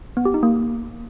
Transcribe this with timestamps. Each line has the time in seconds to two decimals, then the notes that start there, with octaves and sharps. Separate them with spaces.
0.17 B3
0.25 G4
0.34 D#4
0.43 A#3